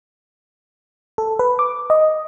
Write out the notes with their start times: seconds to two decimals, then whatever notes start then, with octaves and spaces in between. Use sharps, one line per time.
1.18 A4
1.39 B4
1.59 D6
1.90 D#5